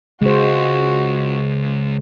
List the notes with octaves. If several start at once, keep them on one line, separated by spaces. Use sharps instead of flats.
C#2 G#3 F#4 C5